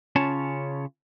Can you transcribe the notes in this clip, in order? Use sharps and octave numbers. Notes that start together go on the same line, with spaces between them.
C#3 C#4 F4 C#5 A5